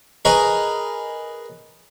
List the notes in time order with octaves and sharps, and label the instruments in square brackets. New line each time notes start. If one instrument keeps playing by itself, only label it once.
[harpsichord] G#4 A#4 B4 C#5 D#5